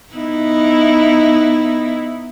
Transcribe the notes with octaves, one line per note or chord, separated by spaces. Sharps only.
B3 D#4 E4